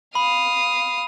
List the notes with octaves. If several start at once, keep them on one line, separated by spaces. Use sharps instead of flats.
F5 B5 D#6